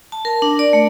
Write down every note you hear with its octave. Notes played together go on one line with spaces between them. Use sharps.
A5
A#4
D4
D5
A3